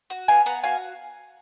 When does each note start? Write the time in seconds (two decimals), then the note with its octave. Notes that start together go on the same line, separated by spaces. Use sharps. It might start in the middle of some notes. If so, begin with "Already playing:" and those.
0.10 F#4
0.28 B3 F5 G#5
0.46 B3 F#5 A#5
0.64 F#4 F5 G#5